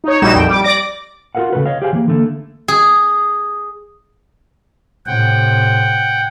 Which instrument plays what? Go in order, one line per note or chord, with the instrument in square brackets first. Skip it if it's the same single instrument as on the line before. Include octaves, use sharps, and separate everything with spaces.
[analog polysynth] D#4 C#5
A#1 G3 D#4 E4 F#4 E7
A#1 F2 G5
G3 D6
D5 D6 A#6
[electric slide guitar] F4 F#4 A4 A#4 F5 F#5
C#3 G#3 A3 F#4 A4 B4
C#5 D#5 F5
G4 G#4 C5 E5 F5 G#5
E3 A#3
D3 A3 A#3
[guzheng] G#4
[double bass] A2 C3 [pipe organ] F#5 G5